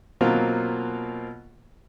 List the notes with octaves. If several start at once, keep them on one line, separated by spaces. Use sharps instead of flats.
B2 F#3 A#3 C4 F4